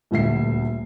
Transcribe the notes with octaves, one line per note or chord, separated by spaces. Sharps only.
D#1 D2 E5 C7